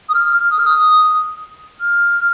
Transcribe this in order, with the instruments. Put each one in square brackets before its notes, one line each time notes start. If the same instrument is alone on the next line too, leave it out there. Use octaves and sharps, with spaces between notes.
[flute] D#6
F6
F6
D#6
F6
D#6
F6